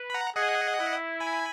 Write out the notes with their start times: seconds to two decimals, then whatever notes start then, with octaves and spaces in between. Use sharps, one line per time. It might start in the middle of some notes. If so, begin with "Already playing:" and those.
Already playing: B4
0.10 B5
0.14 F#5 A#5
0.36 G#4 D#5 F#5
0.78 E4
1.20 G#5 B5